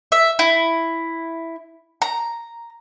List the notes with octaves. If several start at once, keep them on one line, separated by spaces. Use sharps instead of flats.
E5
E4
A#5